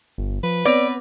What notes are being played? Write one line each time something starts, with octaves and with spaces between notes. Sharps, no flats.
G1
F3 B4
B3 C4 C#5 D5